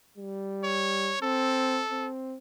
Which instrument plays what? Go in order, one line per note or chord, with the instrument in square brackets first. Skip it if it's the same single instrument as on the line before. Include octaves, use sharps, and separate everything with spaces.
[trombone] G3
[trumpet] C#5
[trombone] C4 [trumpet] A4
[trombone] C4